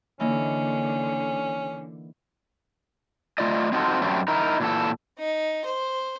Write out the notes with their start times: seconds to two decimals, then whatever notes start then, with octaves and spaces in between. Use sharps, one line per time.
0.20 D3 E3 A#3 C#4 D#4
3.38 A3 F4 D5 D#5
3.72 C4 D#4 F4 F#4 A4 C5
4.02 F#2 G3 A3 C4
4.28 D#4 E4 A#4
4.60 A#2 E3 A4
5.18 D#4
5.65 C5